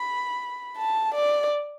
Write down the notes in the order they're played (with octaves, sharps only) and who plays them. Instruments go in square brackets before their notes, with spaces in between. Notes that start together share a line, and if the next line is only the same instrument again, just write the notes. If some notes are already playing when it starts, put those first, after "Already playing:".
Already playing: [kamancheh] B5
A5
D5